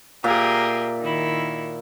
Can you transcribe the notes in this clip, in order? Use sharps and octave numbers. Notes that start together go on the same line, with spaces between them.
A#2 G4 G#4 A#4 E5
D#3 E4